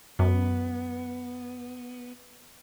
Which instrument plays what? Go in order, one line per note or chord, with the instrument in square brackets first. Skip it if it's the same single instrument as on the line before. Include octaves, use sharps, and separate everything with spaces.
[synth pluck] F#2 [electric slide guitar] B3